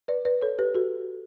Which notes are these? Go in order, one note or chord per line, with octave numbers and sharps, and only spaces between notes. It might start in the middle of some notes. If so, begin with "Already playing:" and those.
B4 D5
B4 D5
A4 C#5
G4 B4
F#4 A4